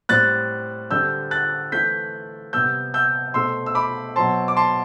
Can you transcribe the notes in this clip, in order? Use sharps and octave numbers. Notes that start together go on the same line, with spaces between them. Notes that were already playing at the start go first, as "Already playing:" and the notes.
A2 G3 C4 F#6 A6
D3 G3 C4 E6 G6
F#6 A6
E3 A3 C4 G6 B6
C3 G3 B3 E6 G6
E6 G6
B2 A3 C4 C6 E6
E6
B5 D6
B2 F#3 C4 A5 C6
D6
A5 C6